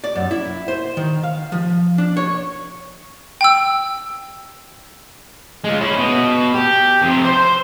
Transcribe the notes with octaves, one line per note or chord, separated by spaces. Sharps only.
D5
F#2
E4
C5
D#3
F5
F3
D4
C#5
G5 E6
G#3 F4
C#4 E4
B2
G4
F2 C3
C5 C6